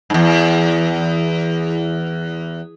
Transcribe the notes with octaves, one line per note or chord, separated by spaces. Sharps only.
E2 G#2